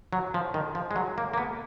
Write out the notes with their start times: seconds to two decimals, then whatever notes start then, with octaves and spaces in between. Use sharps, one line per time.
0.13 F#3
0.34 F3
0.54 D#3
0.75 F3
0.91 G#3
0.96 F#3
1.18 A#3
1.34 A#3
1.38 B3